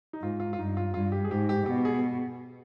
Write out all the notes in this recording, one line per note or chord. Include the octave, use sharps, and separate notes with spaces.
D#4
G#2 F4
F4
F4
G2 D#4
F4
G2 F4
G4
G#4
G#2 G4
G4
B2 G4
G#4